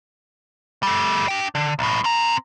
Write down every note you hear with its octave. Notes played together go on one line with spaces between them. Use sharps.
G3 A3
D4 G5
D3
B1 A2
C4 A#5